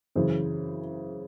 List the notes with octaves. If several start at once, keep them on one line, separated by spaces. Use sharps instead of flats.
F#2 C#3 E3 C5